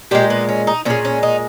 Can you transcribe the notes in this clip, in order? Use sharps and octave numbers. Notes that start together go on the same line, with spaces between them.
A#2 G#3 G4
B3
C#4
D#4
A#2 G#3 C#4
C#4
D#4